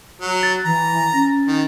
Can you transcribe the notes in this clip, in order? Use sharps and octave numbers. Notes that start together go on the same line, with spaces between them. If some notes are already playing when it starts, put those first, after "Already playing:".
F#3
A6
E3 A#5
C#4
D#3